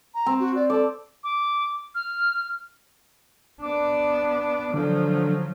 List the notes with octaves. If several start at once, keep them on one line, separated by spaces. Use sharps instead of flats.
A#5
C4
F#4
D5
A4 D5
D6
F6
B3 D4 D6
D3 F3 F#3